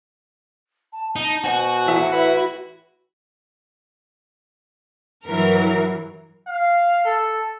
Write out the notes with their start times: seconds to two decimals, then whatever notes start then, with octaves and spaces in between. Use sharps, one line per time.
0.93 A5
1.16 D#4 A5
1.44 B2 F#4 C5 G#5
1.86 E2 A2 E5
2.13 E4 B4 B5
5.25 G2 E3 F#3 A#4
6.47 F5
7.05 A4